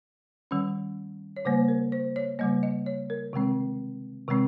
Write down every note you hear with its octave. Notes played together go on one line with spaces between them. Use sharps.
D#3 G3 C#4
C#5
C#3 G3 A#3 C5
A#4
C5
C#5
C#3 G3 A#3 D#5
D#5
C#5
A#4
C3 D#3 G#3 C4
C3 D#3 G#3 C4